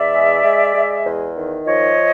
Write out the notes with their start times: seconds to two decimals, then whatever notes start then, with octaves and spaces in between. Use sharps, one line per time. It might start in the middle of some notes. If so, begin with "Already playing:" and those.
Already playing: E2 D5 E5
0.14 G#3
0.44 G#3
0.75 G#3
1.04 E2
1.35 D#3
1.65 F3 C#5 D#5